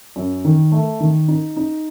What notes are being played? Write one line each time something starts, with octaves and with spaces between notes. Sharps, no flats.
F#2
D#3
A3
D#3
D#4
D#4